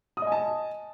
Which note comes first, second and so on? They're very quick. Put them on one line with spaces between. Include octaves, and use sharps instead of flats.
D#6 D#5 G#5 A5